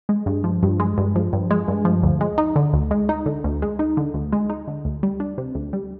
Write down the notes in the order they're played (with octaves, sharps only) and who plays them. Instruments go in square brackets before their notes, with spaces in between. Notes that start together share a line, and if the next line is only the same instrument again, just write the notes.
[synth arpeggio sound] G#3
G2
F3
G2
G#3
G2
F3
G2
G#3
G2
F3
D2
G#3
D#4
D3
D2
G#3
D#4
D3
D2
G#3
D#4
D3
D2
G#3
D#4
D3
D2
G3
D4
C3
D2
G3